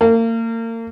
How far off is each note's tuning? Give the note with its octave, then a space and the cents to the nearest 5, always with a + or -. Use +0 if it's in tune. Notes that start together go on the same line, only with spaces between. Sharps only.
A#3 -35